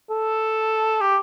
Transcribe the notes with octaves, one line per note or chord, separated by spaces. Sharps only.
A4
G4